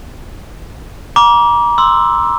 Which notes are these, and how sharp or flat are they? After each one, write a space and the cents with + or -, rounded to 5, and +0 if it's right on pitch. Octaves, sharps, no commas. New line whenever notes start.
A#5 +35 D6 -15
C6 +0 E6 +0